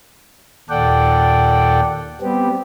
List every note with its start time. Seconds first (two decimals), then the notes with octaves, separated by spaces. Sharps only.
0.69 D#2 A#2 A4 D5 F#5 G5
2.21 G3 B3 C4 G4